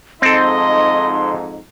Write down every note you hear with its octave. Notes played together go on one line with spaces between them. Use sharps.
F2 G#2 C4 D#4 A4 D#5 C6